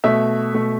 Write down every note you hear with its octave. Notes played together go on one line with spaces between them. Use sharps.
B2 A3 E5
B2 A3